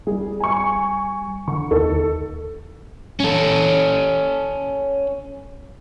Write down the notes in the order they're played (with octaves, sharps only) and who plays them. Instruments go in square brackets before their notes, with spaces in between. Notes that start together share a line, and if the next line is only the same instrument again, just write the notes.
[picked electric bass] G3 [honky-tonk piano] G#4
[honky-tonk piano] G#5 C#6
[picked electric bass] D3 [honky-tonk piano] C#6
[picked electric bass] D#2 [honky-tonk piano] D#4 A4
[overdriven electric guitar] C#4 A4